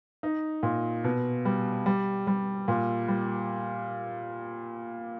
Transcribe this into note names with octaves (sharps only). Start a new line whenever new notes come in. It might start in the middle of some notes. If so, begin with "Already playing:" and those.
D#4
A#2
B2
G3
G3
G3
A#2
G3